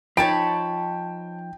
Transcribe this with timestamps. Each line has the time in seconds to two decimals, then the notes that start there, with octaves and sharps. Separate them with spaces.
0.17 F3 D#4 C#5 G5 A5 B5 D7